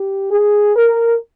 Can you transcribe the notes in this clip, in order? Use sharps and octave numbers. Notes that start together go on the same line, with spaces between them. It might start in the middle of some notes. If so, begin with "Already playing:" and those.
Already playing: G4
G#4
A#4